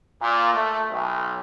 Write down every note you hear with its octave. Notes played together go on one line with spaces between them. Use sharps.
A#2
A3
B1